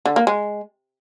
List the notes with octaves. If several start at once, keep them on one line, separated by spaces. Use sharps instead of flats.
D3
A#3
G#3